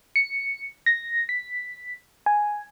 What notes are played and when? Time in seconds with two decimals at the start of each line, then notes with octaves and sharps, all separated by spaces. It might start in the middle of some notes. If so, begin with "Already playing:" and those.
0.16 C#7
0.86 A#6
1.29 B6
2.26 G#5